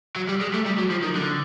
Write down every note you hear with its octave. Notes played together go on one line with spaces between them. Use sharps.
F#3
G3
G#3
A3
G3
F#3
F3
D#3
D3